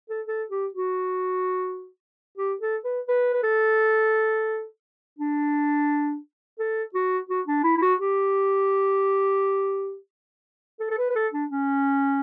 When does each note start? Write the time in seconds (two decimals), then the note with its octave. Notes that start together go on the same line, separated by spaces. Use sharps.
0.10 A4
0.28 A4
0.50 G4
0.74 F#4
2.38 G4
2.61 A4
2.84 B4
3.08 B4
3.33 B4
3.43 A4
5.19 D4
6.59 A4
6.94 F#4
7.29 F#4
7.47 D4
7.64 E4
7.77 E4
7.82 F#4
7.99 G4
10.80 A4
10.91 A4
10.98 B4
11.10 B4
11.15 A4
11.33 D4
11.50 C#4